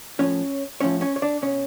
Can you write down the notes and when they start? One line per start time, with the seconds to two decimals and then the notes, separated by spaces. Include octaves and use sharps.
0.19 A2 F3 C#4 C#5
0.81 A2 F3 C#4 C#5
1.01 C#4 C#5
1.16 C#5
1.22 D4 D5
1.42 B2 C#4 C#5